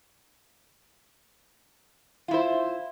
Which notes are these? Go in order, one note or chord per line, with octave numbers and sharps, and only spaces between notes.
E4 F4 C5